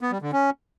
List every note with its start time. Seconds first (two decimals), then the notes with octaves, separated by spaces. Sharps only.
0.01 B3
0.11 G3
0.22 D3
0.33 C#4